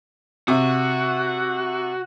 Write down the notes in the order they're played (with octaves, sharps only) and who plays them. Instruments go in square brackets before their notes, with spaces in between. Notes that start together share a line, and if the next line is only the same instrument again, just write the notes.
[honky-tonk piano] C3 [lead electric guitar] F#4